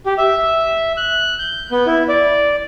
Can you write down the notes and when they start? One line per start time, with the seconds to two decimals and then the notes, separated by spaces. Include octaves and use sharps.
0.06 G4
0.18 E5
0.97 F#6
1.39 G6
1.71 B3
1.86 E4
2.09 D5